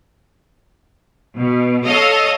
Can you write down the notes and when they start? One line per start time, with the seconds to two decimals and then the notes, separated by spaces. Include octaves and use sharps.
1.37 B2
1.86 A4 C#5 D#5 F5